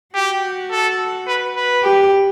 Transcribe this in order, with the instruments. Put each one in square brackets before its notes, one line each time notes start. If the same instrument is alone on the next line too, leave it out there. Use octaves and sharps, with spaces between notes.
[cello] F#4 [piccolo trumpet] G4
[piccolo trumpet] A4
B4
B4
[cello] G4